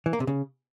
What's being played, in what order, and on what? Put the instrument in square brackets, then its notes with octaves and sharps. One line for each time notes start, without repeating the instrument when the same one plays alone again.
[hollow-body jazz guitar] E3
A#3
C3
C#3